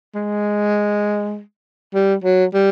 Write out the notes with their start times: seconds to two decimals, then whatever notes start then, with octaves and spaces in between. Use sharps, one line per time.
0.15 G#3
1.94 G3
2.24 F#3
2.53 G3